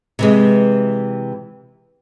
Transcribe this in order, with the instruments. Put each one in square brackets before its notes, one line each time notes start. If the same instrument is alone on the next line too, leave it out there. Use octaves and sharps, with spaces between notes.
[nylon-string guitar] C3 E3 G#3